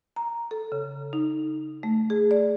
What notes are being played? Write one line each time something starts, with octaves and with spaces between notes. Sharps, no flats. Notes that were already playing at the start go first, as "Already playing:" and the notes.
A#5
A4
C#3
D#4
A3
G#4
D5